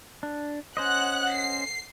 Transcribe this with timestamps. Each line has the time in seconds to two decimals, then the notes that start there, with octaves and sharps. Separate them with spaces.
0.23 D4
0.77 C#4 C5 D#5 F#5 F#6
1.34 C7